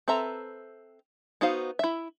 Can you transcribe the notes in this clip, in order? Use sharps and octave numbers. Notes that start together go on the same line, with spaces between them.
C4 A4 B4 E5 A#5
B3 D#4 F#4 C5 F5
E4 E5